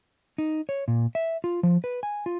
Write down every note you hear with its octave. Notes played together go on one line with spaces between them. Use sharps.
D#4
C#5
A#2
E5
F4
F3
B4
G#5
F4